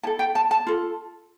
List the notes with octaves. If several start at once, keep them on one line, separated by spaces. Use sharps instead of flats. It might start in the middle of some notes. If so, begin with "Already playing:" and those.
E4 A4 A5
G5
A5
A5
F4 A4